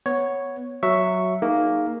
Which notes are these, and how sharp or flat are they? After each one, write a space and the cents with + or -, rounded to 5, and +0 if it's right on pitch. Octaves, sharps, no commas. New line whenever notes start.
B3 +0 C#5 +0
F#3 +0 E5 +0 C#6 +0
A#3 +5 D#4 +0 G#4 +10